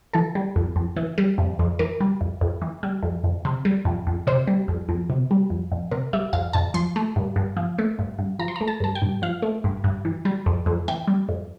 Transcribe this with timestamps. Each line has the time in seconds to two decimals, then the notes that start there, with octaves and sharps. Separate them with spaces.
0.13 E3 A4
0.35 G3
0.56 F2
0.76 F2
0.96 E3
1.18 G3
1.38 F2
1.59 F2
1.79 E3 A#4
2.00 G3
2.21 F2
2.41 F2
2.62 E3
2.83 G3
3.03 F2
3.24 F2
3.45 C3
3.65 G3
3.85 F2
4.07 F2
4.27 C3 C5
4.47 G3
4.68 F2
4.89 F2
5.10 C3
5.31 G3
5.50 F2
5.72 F2
5.91 C3 A#4
6.13 G3 E5
6.33 F2 F5
6.53 F2 A5
6.74 F3 C6
6.96 A3
7.16 G2
7.36 G2
7.57 F3
7.78 A3
7.99 G2
8.19 G2
8.39 F3 A#5
8.48 C6
8.56 A3 A#5
8.68 A5
8.80 G2 A5
8.95 G5
9.02 G2
9.22 F3 F5
9.42 A3
9.64 G2
9.84 G2
10.05 E3
10.25 G3
10.46 F2
10.66 F2
10.88 E3 G5
11.07 G3
11.29 F2